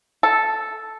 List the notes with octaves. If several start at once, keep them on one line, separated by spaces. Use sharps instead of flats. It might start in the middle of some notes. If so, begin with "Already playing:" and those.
A4